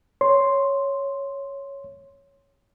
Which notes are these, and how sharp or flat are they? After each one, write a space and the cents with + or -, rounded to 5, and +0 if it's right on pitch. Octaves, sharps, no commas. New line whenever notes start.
C#5 +0 C6 +0